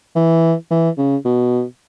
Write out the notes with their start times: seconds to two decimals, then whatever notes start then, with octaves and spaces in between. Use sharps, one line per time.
0.16 E3
0.71 E3
0.98 C#3
1.25 B2